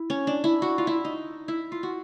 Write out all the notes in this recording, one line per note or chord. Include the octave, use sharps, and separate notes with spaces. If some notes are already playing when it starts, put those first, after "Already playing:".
Already playing: E4
C#4
D4
E4
F#4
F4
E4
D#4
E4
F4
F#4